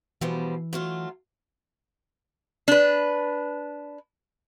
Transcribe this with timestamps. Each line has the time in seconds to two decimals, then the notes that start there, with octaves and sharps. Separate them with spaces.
0.21 B2 E3 F3 G3
0.73 F#3 A3 F4
2.68 D4 B4